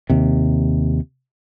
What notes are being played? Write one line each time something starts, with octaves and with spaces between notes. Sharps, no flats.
D#2 C3